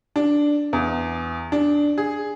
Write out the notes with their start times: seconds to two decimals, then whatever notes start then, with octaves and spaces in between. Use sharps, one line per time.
0.16 D4
0.73 E2
1.52 D4
1.98 G#4